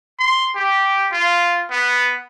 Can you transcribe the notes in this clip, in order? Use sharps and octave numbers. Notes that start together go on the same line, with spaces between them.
C6
G4
F4
B3